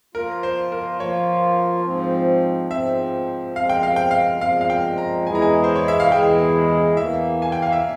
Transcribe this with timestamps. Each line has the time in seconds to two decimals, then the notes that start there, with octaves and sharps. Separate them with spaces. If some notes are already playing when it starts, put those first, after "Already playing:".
0.15 F3 A#3 F4 A#4
0.43 C5
0.72 A#4
1.00 F3 A#3 F4 C#5
1.85 G#2 F3 C4
2.71 G#2 F3 C4 E5
3.56 A#2 F3 G#3 C4 F5
3.69 G5
3.83 F5
3.96 G5
4.11 F5
4.41 A#2 F3 G#3 C4 F5
4.61 F5
4.70 G5
4.98 A#5
5.26 E2 E3 G#3 E4 G#4 G#5
5.35 A#5
5.42 G#5
5.64 C5
5.76 C#5
5.88 E5
6.00 F5
6.12 E2 E3 G#3 E4 G#4 G5
6.97 E2 E3 A#3 E5
7.42 G#5
7.52 G5
7.62 F5
7.72 E5